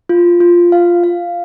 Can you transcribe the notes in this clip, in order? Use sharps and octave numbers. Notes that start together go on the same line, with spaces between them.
F4
F4
F5
F5